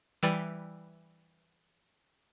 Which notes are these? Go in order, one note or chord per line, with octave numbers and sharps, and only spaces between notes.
E3 G3 B4 A6